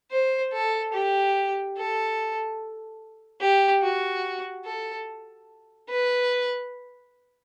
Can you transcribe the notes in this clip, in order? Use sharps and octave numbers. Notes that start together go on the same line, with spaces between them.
C5
A4
G4
A4
G4
F#4
A4
B4